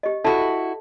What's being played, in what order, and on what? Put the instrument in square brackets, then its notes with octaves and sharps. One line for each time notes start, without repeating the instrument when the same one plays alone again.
[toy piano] G4 D#5
[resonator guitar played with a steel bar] E4 F#4 [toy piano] A4 E5 A5